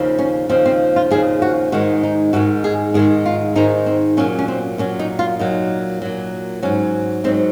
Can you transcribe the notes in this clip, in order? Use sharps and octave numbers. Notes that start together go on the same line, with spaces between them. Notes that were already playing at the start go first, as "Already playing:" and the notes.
Already playing: D#2 C#3 F3
C#4
D#2 C#3 F3 C4
C4
F4
D#2 C#3 F3 G#4
F#4
G#2 D#3 G#3 F#4
D#4
G#2 D#3 G#3 F#4
G#4
G#2 D#3 G#3 G#4
F4
G#2 D#3 G#3 D#4
C4
A#2 F#3 C#4
C#4
C4
A#2 F#3 C#4
D#4
F4
A#2 F#3 D#4
A#2 F#3
G#2 F#3 C#4
G#2 F#3 C4